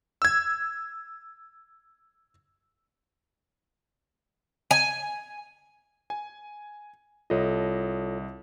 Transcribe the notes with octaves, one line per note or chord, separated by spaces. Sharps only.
E6 G#6
G#5
G#5
C2 F4 A4 C#5 D#5